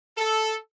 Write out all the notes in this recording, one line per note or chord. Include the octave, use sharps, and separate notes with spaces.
A4